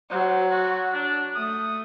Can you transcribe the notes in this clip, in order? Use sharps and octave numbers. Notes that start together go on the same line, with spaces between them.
F#3 C5
F#4
D4
A3 D#6